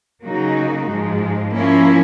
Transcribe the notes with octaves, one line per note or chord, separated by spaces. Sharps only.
C#3 F#3 A#3 D#4 F#4
G#2 F3 G#3
F3 A#3 C#4 E4